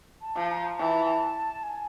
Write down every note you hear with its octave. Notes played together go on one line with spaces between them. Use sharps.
A5
F3
A#5
A#5
E3 A5
G#5